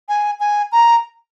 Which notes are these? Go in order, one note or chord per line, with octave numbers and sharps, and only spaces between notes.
G#5
G#5
A#5